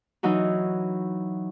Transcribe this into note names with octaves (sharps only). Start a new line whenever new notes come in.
E3 F#3 D#4 F#4